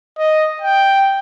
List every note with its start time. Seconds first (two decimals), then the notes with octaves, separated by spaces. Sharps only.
0.18 D#5
0.62 G5